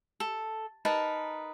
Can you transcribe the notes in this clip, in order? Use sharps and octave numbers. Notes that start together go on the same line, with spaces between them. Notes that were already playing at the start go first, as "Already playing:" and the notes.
A4
D#4 A#4 B4 A5